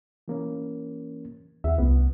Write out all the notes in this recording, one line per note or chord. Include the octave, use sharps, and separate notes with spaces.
E3 A#3 C#4
D#2 E5 F#5
C2 B3